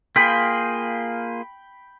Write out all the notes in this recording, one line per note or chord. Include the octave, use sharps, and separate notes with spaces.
A#3 F4 G#4 G5 B5